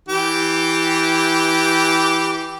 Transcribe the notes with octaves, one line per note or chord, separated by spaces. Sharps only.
E3 G4